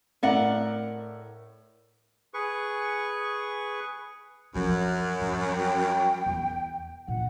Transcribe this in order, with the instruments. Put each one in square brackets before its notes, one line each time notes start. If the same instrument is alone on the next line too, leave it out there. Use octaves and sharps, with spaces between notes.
[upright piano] A2 E5 [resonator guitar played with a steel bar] A#4 D5 F#5
[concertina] G#4 B4 C#6
[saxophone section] F#2 [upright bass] F3 D4
[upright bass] F3 G3
[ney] G5
[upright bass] E2
[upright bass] A#2 D4 [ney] F#5